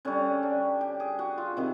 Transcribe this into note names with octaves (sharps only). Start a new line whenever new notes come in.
D3 G3 C#4
D4
G4
G#4
F#4
F4
C3 D#3